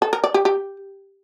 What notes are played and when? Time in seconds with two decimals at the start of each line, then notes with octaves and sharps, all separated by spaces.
0.02 A4
0.13 A#4
0.24 D5
0.34 G4
0.45 G4